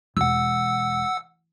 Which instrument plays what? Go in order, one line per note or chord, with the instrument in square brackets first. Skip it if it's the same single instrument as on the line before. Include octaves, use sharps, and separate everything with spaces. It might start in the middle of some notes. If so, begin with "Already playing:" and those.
[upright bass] E1 [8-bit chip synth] F#5 E6